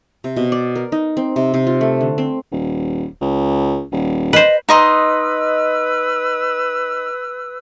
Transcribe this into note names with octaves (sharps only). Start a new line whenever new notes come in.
C3
B2
D5
A#4
D#4
C4
C3
C3
F4
A3
D3
C4
D#1
C#2
D#1
B4 C5 D#5
D#4 B4 D#5 C6 E6